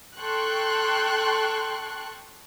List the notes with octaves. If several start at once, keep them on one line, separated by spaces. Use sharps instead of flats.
A4 G5 C6 C#6 F#6